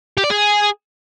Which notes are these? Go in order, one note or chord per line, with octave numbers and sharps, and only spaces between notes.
G4
D5
G#4